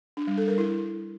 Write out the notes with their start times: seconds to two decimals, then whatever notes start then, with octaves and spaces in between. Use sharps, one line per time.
0.17 D4
0.27 G3
0.37 A4
0.48 A#4
0.58 E4